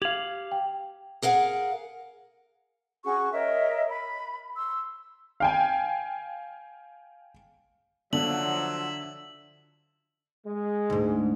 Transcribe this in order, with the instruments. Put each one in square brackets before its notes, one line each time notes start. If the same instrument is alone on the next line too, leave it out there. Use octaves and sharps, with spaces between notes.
[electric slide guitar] G4 F5 [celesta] G#6 F7 F#7
[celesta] G5
[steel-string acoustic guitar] G#4 A#4 F5 F#5
[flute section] C#4 F#4 G#4 C#6
A#4 C#5 D#5 E5
B5
C6 E6
[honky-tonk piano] F5 G5 G#5
[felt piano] D3 [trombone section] F3 F#3 [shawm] E5 [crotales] F#7
[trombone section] G#3
[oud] D2 G#2